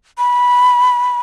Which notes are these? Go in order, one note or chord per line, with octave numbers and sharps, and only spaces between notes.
B5